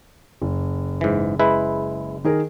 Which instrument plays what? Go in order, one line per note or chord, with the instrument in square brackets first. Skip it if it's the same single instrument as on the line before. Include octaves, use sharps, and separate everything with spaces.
[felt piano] F#1
[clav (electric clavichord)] G#2 E3
G#3 E4 B4
[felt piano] D#3 G#4 A#4